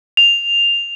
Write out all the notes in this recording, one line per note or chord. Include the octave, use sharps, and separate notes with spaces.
F7